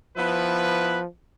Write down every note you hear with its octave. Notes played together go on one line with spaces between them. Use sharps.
F3 B3 E4 B4